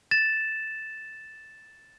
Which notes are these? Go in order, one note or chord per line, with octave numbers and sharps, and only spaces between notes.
A6 E7